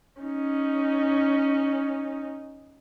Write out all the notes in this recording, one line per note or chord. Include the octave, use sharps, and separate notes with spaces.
C#4 D#4